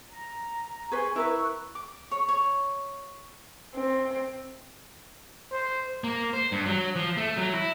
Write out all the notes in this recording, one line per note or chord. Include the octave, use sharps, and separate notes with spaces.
A#5
G#4 B4 C5 G#5 C#6
E4 A#4 B4 C#6 E6 F#6
D6
C#5
C#5
C4
C5
A#3
C5
G2
F#3
F3
A3
F#3
E4